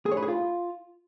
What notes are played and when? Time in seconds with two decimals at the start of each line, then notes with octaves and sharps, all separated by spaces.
0.06 G#4
0.11 C#5
0.17 B4
0.22 G#4
0.28 F4